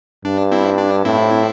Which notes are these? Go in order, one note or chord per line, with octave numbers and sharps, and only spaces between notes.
G2 D4
C4 E4
D4
A2 C4 E4